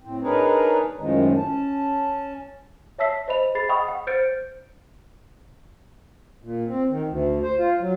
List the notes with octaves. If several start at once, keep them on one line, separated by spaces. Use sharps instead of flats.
A2 C4
D4 D#4 G#4 A#4 B4 C#5
F#2 A2 D#3 F3 G#3
C#4 A5
C#5 E5 A5 E6 B6 C7
C5 D#5 B5 F7
G#4 B5 A6 C7
D#5 F#5 G5 B5 C#6 D#6
F#5
C5 F6 G6 A6 C#7 D7
A#2
C4
D#3
D2
C5
F4
F#3